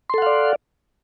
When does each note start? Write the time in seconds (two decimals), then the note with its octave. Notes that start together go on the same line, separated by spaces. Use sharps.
0.10 C6
0.14 A4
0.18 F#5
0.22 F5
0.26 D5